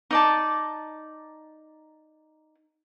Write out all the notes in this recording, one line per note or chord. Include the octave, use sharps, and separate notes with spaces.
D#4 D5 A5